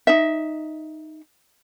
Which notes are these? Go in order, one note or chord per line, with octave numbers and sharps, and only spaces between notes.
D#4 E5